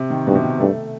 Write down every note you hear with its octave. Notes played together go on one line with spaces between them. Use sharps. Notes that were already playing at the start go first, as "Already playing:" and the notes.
Already playing: C3
D#3
G2 B2
C3
D#3
G2 A3